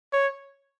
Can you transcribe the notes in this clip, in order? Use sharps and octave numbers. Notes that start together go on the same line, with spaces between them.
C#5